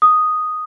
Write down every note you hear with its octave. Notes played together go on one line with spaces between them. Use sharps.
D#6